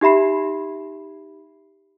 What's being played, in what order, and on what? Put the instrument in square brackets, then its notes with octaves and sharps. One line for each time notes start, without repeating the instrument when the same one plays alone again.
[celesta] D#4 G4 E5 B5 C7